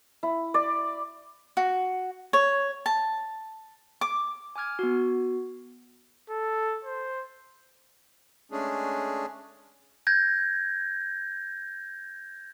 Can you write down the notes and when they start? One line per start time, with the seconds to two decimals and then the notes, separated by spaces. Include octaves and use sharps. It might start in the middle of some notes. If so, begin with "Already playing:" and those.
0.23 E4
0.54 D5
1.57 F#4
2.33 C#5
2.86 A5
4.01 D6
4.56 G#5 D6 F6 G#6
4.79 B3 F#4
6.30 A4
6.85 C5
8.52 G#3 A3 C#4 D4 G#4
10.07 G6 G#6 A#6